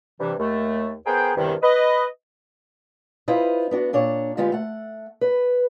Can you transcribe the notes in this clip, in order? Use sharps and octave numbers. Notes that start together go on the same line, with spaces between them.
G2 C3 E3
D#2 A3
B3 G#4 A#4 C5 G5
E2 G2 C3 D#3
B4 D#5
E4 F4 B4 C5 D#5
B3 D4 F#4
A#2 D4 C#5
D3 G#3 B3 F4 G4
A3 F#5
B4